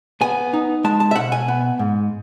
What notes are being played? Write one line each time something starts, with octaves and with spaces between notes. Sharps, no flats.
B3 G#5
D#4
G#3 A5
A5
E5
B2 F#5
G#5
B3
G#2